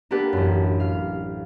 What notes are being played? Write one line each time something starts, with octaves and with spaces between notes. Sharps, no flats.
A#3 B3 D4 G4 A4 B4
A1 F#2
F5